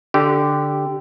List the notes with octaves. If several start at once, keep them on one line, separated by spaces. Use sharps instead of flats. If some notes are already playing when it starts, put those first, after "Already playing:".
D3 G4